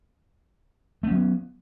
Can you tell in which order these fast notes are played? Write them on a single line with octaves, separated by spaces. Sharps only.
A3 C#4 F#3 B3